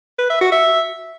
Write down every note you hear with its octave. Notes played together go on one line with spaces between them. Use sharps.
B4
E5
F#4
E5